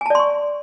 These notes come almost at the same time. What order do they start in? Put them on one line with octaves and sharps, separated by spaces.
G#5 A5 D5 C6 C#6